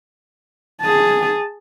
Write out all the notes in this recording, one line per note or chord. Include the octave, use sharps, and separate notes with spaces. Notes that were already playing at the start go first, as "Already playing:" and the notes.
G#4 A5